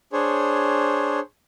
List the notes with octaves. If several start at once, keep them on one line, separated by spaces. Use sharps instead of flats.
D4 G#4 C5 C#5